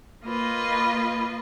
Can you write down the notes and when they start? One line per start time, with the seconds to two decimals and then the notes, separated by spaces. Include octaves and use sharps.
0.24 A#3 F4 B4 D#5